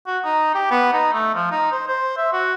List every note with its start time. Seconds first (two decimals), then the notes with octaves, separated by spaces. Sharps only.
0.07 F#4
0.24 D#4
0.55 G4
0.71 B3
0.93 D#4
1.13 A3
1.35 F3
1.51 D#4
1.72 C5
1.88 C5
2.17 E5
2.33 F#4